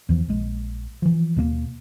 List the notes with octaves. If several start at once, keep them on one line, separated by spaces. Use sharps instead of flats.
E2 E3 F3
A#1 G#3
E3 F3
D#2 B2 A3 A#3